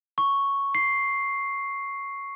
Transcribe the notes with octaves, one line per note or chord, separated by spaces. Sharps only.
C#6
C7